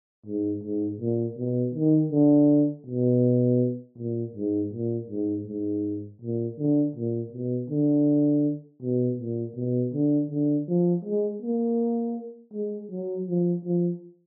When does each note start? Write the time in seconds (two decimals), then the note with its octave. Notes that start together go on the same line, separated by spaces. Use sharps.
0.26 G#2
0.64 G#2
1.01 A#2
1.38 B2
1.75 D#3
2.12 D3
2.87 B2
3.98 A#2
4.36 G#2
4.73 A#2
5.10 G#2
5.47 G#2
6.22 A#2
6.59 D3
6.96 A#2
7.33 B2
7.70 D3
8.83 B2
9.19 A#2
9.57 B2
9.94 D3
10.31 D3
10.68 F3
11.05 G#3
11.42 A#3
12.54 G#3
12.91 F#3
13.28 F3
13.65 F3